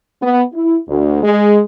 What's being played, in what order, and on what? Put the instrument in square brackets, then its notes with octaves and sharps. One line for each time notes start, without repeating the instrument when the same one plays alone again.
[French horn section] B3
E4
D2
G#3